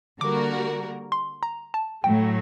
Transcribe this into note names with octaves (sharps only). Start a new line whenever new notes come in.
D3 G3 A#3 F#4 A#4 D6
C6
A#5
A5
A2 F#3 A3 G5